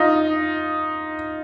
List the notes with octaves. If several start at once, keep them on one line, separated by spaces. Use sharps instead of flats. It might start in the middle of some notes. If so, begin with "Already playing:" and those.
Already playing: D#4 F4